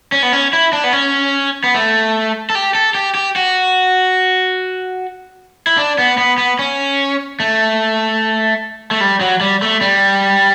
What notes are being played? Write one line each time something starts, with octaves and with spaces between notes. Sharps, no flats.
C#4
B3
C#4
E4
D4
B3
C#4
B3
A3
A4
G4
A4
G4
G4
F#4
E4
D4
B3
B3
B3
C#4
A3
A3
G3
F#3
G3
A3
G3